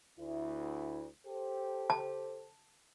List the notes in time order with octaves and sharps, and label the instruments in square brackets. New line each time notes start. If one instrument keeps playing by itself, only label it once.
[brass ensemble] D2 E4
G4 A4 C5
[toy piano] A5